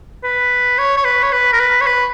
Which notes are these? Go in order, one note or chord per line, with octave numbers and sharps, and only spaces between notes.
B4
C#5
C#5
B4
C#5
B4
A#4
B4
C#5
B4